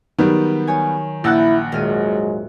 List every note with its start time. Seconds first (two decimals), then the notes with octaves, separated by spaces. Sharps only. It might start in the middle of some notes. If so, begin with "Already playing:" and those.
0.19 D#3 F#3 G3 B3
0.67 C#5 G#5
1.24 A#1 E4 F#5 A5 E6 F#6 G6
1.72 D#1 G#2 F#3 G#3 F6 D#7